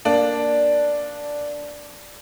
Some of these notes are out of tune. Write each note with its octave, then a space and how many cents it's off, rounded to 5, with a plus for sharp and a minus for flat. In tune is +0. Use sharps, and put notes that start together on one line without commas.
A#3 +5 D4 +0